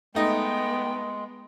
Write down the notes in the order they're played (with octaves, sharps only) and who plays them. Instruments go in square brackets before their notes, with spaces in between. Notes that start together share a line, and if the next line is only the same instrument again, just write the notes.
[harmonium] G#3 [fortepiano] A3 D#4 [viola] B3 [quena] G5